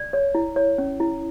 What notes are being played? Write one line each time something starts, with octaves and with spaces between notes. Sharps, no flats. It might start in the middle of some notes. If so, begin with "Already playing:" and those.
Already playing: D5
C#5
E4
C#5
C#4
E4